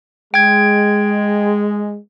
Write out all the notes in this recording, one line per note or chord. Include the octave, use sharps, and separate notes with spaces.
G#3 G5 G#6